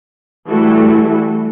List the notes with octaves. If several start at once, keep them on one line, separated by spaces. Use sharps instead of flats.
E3 G3 A3 E4 F#4 A4